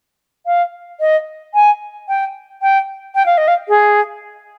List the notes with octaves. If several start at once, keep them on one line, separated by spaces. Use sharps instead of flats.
F5
D#5
G#5
G5
G5
G5
F5
D#5
F5
G#4